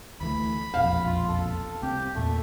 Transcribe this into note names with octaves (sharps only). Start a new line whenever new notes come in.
D2 E3 A3 B5
E1 A#1 F2 F5
F4
A4
C2 C4 G4
E2 A#2 A3